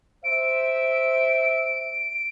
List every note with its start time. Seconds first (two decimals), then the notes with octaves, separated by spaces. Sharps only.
0.24 C5 E5 D7